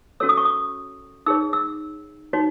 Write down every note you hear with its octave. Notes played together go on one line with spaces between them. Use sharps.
C#4 F#4 A4 C#5 E6
D#6
C#6
D#6
D#4 G#4 C#5 E6
E6
D#4 F#4 C#5